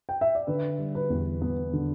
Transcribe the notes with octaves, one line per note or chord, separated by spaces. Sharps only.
G5
E5
D5
D3 B4
G3
B4
E2
B3
D3